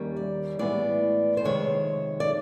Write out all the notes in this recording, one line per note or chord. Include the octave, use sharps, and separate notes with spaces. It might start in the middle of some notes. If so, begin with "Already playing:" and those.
Already playing: D#2 D#3 G3 A#3 C#4
D5
A2 E3 G#3 B3 D5
C5
F2 C3 D#3 G#3 C#5
D5